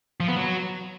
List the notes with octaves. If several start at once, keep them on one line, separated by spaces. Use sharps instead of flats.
F3
B3
F#3